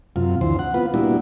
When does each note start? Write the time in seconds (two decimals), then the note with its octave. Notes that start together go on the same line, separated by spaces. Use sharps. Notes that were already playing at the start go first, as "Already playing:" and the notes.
0.16 F#2 C3 F4
0.41 D2 E3 C5
0.59 F#5
0.74 B3 F4 B4
0.94 A#2 G3 B3 D4 E4 F#4